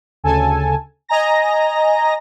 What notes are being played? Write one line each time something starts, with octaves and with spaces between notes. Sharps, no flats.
D2 C#3 A4 G#5 A5
D#5 G#5 A#5 A#6